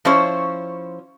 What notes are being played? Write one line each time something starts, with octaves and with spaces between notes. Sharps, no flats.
F3 C#4 E4 C5 C#5